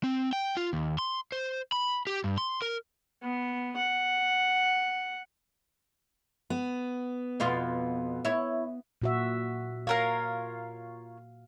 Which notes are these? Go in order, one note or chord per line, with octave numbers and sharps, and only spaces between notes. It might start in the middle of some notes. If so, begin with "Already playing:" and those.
C4
G5
F4
D#2
C6
C5
B5
G4
G2
C6
A#4
B3
F#5
B3
F2 B2 F4
E4 C#5
A#2 F#4 E5
F4 A#4 C#5 F5